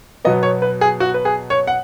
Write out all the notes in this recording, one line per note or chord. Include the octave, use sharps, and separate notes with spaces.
B2 F#3 B3 D#5
C#5
B4
G#4
F#4
B4
G#4
C#5
F#5